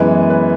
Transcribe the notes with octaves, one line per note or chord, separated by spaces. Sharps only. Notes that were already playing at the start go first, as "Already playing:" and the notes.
Already playing: F#2 E3 G#3 B3 B4
B4